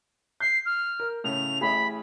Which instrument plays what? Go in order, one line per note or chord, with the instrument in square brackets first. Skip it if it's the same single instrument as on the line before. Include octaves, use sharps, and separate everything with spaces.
[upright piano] G6 [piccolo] C7
[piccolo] F6
[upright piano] A#4
[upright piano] A2 C#3 A3 [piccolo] F7
[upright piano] A1 A2 G#4 [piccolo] B5